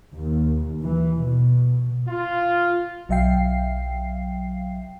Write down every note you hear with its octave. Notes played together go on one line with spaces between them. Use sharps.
D#2
E3
B2
F4
B1 F#3 E5 F5 G5 C7